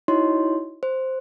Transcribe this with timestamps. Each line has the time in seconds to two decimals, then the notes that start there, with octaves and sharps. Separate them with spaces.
0.08 D#4 E4 F#4 C#5 D#5 C6
0.83 C5